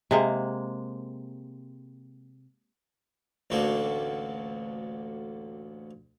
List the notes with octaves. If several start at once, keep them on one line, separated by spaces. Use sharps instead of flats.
C3 G#3 A#3
A1 D2 A#3 F#4 A4 D5